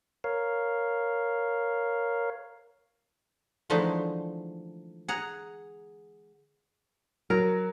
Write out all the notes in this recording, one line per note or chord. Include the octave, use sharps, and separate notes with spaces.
A#4 C#5 F5
D3 E3 F3 G#3 A3 D#4
G#4 F#5 A#5
F#3 A#4